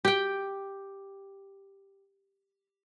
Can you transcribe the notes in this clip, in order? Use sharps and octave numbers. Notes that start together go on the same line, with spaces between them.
G4 G5